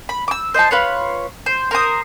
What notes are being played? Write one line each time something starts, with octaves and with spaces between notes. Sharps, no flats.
B5
D6 E6
C5 D#5 E5 A5
F4 B4 C#5
C5
A#4 C5 D#6